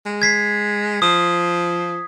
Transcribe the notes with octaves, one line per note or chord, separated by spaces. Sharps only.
G#3
G#6 B6 C7
F3 D#6